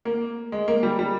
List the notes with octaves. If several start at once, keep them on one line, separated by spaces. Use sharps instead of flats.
A#3
G#3
A#3
G3
G3